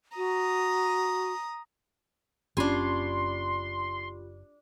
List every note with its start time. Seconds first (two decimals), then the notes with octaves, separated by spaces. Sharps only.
0.17 F#4 A#5 D#6
2.57 F#1 C#4 D4 F4 G4 G#5 B5 C6